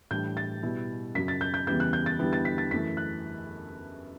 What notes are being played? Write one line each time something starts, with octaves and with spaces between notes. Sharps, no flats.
A2 E3 G3 D4 G6
A6
B2 G3 B3 E4
F#2 C#3 F#3 B6
A6
G6
G6
E2 C#3 E3 G3 B3 G6
F#6
G6
A6
E2 D3 G3 B3 E4
A6
B6
A6
F#2 E3 A3 E4 B6
F#6